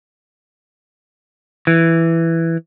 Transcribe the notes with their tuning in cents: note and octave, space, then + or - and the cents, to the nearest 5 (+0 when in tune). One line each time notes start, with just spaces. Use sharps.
E3 +5